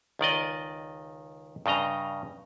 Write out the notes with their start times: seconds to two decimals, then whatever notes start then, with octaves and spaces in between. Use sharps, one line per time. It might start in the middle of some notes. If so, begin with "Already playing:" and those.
0.19 C#2 D#3 D5 D#5
1.66 G2 C#3 D#5 A#5